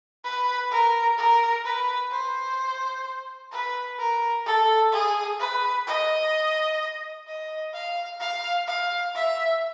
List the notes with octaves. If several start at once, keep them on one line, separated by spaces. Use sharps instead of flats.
B4
A#4
A#4
B4
C5
B4
A#4
A4
G#4
B4
D#5
D#5
F5
F5
F5
E5